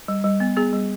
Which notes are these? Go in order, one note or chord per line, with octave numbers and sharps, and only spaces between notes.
G3
G3
B3
B3 G#4
G3